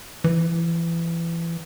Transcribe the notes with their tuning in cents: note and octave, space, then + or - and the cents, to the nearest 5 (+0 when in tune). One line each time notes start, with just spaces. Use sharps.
E3 +25